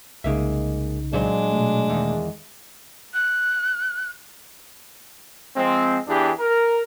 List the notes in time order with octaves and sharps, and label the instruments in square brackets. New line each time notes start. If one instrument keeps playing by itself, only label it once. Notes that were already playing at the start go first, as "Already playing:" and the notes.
[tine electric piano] C2 C#3 D#4 [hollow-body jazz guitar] G#3 A#3 E5
[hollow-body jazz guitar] A#2 F#3 C5 [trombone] G#3 [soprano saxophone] D4
[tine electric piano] B2 A3
[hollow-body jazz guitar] E2 D#3
[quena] F#6
[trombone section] F3 G#3 C4
E2 E3 D4 G4 G#4
A#4